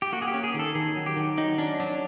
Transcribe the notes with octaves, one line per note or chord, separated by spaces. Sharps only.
G4
A#3 F#4
G#4
G4
C#4
G#4
D#3
A4
D#3 G#4
F#3
G4
D#3
F#3 D#4
C#4 D4
F#3 D4